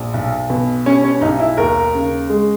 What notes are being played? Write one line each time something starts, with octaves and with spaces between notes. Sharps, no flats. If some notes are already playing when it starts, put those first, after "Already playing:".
Already playing: A#1
B1
B2
G3 C#4
C#4
B1 D#4
E4
D#2 A#4
C#3
G#3